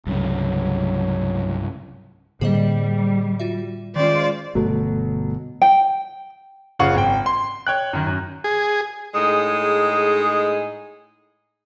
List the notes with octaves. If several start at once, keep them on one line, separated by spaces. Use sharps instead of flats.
C2 G2 C#3 F#3 A3
A2 D3 G3 A#3 G#4 C5 D#5
F4 F#4 E5
D#3 G#3 C#4 F4 C5 D5
G1 B2 F#3 A3 A4
G5
F#1 C#3 F4 F5 F#5 C#6
G#1 G5
C6
C#5 G5 F#6
F#2 D#3
F#2
G#4
A2 G#3 D#4 G#4